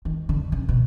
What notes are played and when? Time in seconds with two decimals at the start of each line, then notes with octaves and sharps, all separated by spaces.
0.05 D#3
0.29 D3
0.52 C#3
0.69 B2